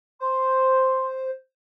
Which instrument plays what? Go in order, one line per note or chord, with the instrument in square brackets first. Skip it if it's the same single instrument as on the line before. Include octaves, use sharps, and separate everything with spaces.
[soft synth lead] C5 [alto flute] C6